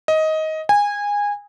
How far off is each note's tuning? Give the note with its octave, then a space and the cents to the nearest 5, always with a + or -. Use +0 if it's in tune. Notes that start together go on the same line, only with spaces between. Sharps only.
D#5 +15
G#5 -20